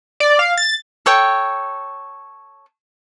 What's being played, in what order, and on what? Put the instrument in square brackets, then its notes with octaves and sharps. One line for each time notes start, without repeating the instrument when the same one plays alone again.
[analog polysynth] D5
F5
A6
[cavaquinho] A4 C#5 G5